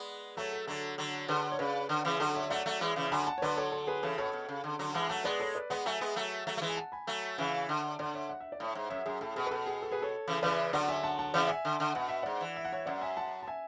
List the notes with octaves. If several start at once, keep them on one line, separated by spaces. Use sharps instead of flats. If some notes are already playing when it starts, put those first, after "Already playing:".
Already playing: G#3 B3 B4 D5
F#3 A3 A4 C#5
A4
D3 F#3 A4
D3 F#3
D3 G#4 B4
C#5
C#3 B4 D5
D3
C#3 E3
D3 F#3 A4
C#5 E5
F#3 A3 D5 F#5
F#3 A3
E3 G#3
C#3 E3
D3 F#3 G#5 B5
F#5 A5
C#5
D3 F#3 B4 D5
A4 C#5
A4
G#4 B4
C#3 E3 A4 C#5
B2 A4 C#5
B2
C#3
D3
D3 F#3
E3 G#3 F#5 A5
F#3 A3 F#5 A5
G#3 B3 B4 D5
A4 C#5
B4 D5
G#3 B3 D5 F#5
F#3 A3 E5 G#5
G#3 B3
F#3 A3
F#3 A3
A3
E3 G#3
G#5
F#5 A5
G#5 B5
F#3 A3
C#3 E3 E5 G#5
D3
D3 D5 F#5
C#5 E5
F#5
E5
D5
A2 C#5 E5
G#2
F#2 C#5 E5
F#2 G#4
A2 A4
B2 G#4
B4
B2 A4
G#4
A4
G#4 B4
A4 C#5
C#3 E3
C#3 E3 B4 D5
D3 F#3 D5 F#5
E5 G#5
F#5 A5
F#5 A5
C#3 E3 D5 F#5
E5 G#5
D3
D3
B2 F#5
E5
G#2 D5 F#5
E3
E5
F#5
C#5 E5
F#2 D5 F#5
E5 G#5
F#5 A5
A5
E5 G#5